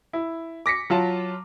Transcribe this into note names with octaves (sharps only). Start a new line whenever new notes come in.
E4
D6 A#6 B6 C#7
F#3 F4 A5